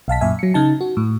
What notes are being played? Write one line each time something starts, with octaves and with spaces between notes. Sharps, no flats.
B1 F5 A5 B6
F#2 A#2 E5 G#5
F#3 C#7
C#3 D#4 A5
F#4
A2